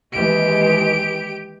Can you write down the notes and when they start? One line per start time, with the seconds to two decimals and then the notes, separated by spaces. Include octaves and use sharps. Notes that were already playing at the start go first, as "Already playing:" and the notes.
0.13 D#2 E3 G#3 G4 D7